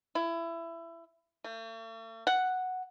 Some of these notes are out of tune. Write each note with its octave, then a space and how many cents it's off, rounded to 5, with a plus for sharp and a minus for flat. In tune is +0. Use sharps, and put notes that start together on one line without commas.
E4 +20
A3 +45
F#5 +0